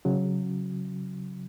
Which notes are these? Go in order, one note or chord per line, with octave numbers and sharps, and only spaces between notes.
C#3 F#3